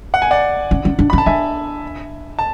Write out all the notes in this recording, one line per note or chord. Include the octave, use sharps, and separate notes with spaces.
F#5
G#5
D5 F#5
C#4
C#4
D4
C#4 B5
A5
D4 E5 G#5
A5